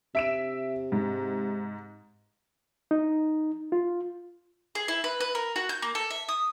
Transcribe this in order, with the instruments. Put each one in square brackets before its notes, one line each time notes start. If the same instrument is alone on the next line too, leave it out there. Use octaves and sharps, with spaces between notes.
[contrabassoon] C3 [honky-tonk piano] E5 D7 E7
[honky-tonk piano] G#2
[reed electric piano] D#4
F4
[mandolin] G#4
E4
B4
B4
A#4
F#4
G6
A#3
A4
E5
D#6